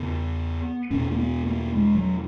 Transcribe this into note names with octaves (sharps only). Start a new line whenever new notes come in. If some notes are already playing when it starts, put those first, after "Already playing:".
Already playing: E2 C#3 B3
E2 B2 C#4
A#3
B3
A#3
G#3
F#3